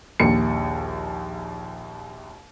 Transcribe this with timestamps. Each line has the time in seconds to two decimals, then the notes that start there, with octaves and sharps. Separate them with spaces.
0.20 A#1 D#2 C#7